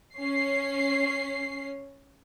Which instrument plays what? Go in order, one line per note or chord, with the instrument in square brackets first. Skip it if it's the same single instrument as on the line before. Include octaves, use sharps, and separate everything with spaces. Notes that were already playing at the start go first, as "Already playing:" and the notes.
[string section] C#4 C7